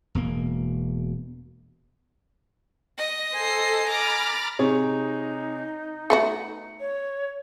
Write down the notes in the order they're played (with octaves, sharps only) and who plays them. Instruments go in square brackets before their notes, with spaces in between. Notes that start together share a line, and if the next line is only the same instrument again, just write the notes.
[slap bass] E1 B2 A#3
[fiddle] D#5
[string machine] A4 [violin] C5 C7 [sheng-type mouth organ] G#5
[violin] A#5 D6 [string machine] B5 F6 A6
[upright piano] C3 G#4 C#5 [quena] D#4
[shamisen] A3 B3 F#4 [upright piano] C#7
[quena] C#5